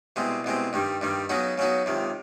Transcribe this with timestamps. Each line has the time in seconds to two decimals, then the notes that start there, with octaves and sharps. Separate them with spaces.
0.16 C2 B2 G#3 C4
0.44 C2 B2 G#3 C4
0.73 G2 D#3 G3
1.01 G2 D#3 G3
1.29 C#3 F#3 B3 D#4 F#4
1.58 C#3 F#3 B3 D#4 F#4
1.86 C#2 C3 D#3